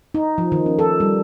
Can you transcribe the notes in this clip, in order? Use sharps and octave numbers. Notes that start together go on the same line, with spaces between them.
D#4
F3
D#3
C#4
A4
G3